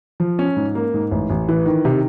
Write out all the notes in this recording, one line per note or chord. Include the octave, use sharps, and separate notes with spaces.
F3
C#4
G#2
A#3
G#2
A1
A1
E3
D#3
C3